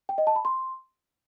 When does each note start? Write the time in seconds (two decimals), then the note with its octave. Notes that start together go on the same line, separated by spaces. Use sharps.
0.09 G5
0.18 D#5
0.27 A5
0.36 B5
0.45 C6